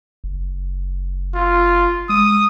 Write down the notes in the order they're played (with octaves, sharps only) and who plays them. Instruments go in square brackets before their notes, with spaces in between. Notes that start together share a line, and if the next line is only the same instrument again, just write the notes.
[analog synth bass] F#1
[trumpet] F4
[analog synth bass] G#3 [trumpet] D#6